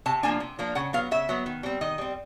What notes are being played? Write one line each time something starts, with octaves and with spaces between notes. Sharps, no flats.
C3 A5
F3 A#3 D4 G#5
C3
F3 A#3 D4
C#3 F#5
F#3 B3 F5
C#3 E5
F#3 B3
D#3
G3 C4
D#3 D#5
G3 C4